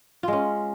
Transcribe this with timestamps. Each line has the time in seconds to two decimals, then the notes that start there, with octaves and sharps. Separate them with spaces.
0.23 F4
0.28 G#3
0.33 C#4